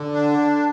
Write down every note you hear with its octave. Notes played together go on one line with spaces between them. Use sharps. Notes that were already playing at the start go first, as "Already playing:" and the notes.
Already playing: D3
D4